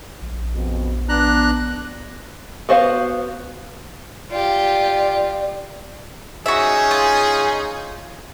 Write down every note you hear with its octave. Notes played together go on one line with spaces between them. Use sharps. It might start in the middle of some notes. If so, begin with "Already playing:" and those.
A#1
F2 B2
B3 D4 A#5 F#6
B3 F#4 C5 F5
F4 G4 D5
C#4 D#4 F#4 G#4 E5
F4